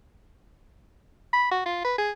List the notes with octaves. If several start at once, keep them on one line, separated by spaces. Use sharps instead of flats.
B5
F#4
F4
B4
G#4